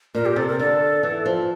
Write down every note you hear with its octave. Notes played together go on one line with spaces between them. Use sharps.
A#2 A#4
G4
C3 A4
A#4
D3 A4
E3
F3